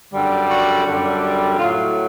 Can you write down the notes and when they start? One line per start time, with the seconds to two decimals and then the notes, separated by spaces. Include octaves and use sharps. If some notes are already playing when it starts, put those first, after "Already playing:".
0.13 F#2 D3 G3
0.50 F#4
0.86 F#2 D3 G3
1.58 A2 F#3 F4